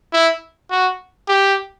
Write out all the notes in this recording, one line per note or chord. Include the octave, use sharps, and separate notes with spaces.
E4
F#4
G4